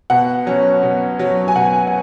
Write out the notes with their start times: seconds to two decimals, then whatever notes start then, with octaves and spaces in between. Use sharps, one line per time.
0.10 B2 F#5
0.46 F#3 C#4
0.83 B2
1.19 F#3 C#4
1.48 G#5
1.56 B2 F#5
1.87 F#5